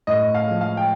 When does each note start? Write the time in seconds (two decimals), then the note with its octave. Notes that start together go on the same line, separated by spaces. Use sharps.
0.07 A2 D#5
0.35 F5
0.48 F3 G#3
0.61 F5
0.77 G5